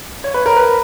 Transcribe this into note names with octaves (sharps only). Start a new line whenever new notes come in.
C#5
B4
A#4
B4